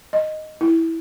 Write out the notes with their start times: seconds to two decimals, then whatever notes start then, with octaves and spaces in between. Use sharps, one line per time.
0.13 D#5
0.61 E4